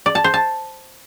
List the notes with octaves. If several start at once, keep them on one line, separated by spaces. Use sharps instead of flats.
D5
A5
C5
A5